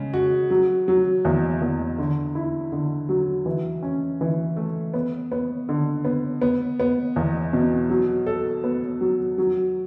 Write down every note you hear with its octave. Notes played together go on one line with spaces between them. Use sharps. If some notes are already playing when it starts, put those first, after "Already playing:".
Already playing: C#3 G#3
F#4
F#3
F#3
E2
E2
D3
E4
D3
F#3
E3
C#4
E3
A3
B3
B3
D3
B3
B3
B3
E2
B2
F#3
A4
B3
F#3
F#3